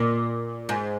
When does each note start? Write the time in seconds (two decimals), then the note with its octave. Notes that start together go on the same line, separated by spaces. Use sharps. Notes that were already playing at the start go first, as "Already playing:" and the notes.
Already playing: A#2
0.69 G#2